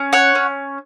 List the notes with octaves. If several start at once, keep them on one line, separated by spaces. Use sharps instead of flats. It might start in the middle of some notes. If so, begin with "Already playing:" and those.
Already playing: C#4
C#5 F#5
C#4